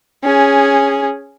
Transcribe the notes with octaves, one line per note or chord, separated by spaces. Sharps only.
C#4 G#4